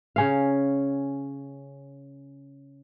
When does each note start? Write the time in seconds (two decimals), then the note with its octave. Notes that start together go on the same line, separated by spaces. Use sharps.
0.16 C#3 C#4 F5